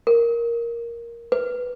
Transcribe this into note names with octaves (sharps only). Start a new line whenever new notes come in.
A#4
B4